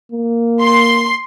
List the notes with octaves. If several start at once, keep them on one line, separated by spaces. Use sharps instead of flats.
A#3
C6